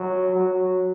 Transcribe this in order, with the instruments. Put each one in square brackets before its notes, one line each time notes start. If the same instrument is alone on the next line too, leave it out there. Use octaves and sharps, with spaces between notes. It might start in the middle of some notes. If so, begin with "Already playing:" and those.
Already playing: [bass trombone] F#3
F#3